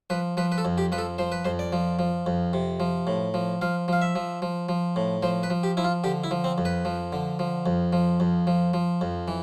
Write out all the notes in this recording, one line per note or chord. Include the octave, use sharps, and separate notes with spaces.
F3 B4
F3 B4
B4
A4
F2
G4
F3 B4
A4
F3 C5
B4
F2 C5
D5
F3
F3
F2
C3
F3
A2
F3
F3 F5
F3 F5
E5
F3
F3
F3
A2
F3 C5
B4
F3
G4
F3 E4
F4
D3 G4
E4
F3
C4
F2
B4
F3
D3
F3
F2
F3
F2
F3
F3
F2
E3